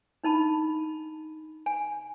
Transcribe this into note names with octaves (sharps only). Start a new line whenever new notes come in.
D4 D#4 A5 B5
G#5